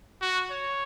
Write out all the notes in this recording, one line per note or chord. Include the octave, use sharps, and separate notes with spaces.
F#4
C#5